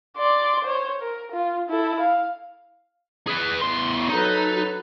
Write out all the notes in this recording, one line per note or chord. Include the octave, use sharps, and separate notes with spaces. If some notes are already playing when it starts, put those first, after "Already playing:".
D5 C6
C5 C#5
A#4
F4
E4 A4
F5
G#4 B4
E2 C6
F#3 D#4 A4 B4